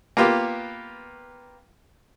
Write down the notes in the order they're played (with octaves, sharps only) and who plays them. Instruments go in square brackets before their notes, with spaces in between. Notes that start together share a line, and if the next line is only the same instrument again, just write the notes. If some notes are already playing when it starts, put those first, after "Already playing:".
[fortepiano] A#3 B3 F4 G4